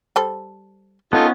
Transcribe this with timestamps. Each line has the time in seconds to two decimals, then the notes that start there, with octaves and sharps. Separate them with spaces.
0.16 G3 A4 C5
1.13 B3 C#4 D#4 F4 A4